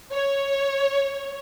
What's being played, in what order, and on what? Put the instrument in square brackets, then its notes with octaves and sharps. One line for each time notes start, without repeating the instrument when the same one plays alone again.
[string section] C#5